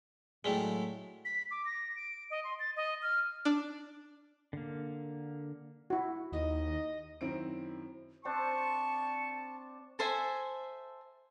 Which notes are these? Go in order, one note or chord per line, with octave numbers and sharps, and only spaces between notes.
A2 F#3 G#3 A3 E4 G#4 D5 G5
B6
D6
A#6
D7
D#5
C6
A6
D#5
F6
D4
D3 A#3
E4 F#4
D#2 D#4 D#5
F#2 D#3 C4 E4 D7
C4 D4 C5 A5 C#6
A4 C5 E5 G#5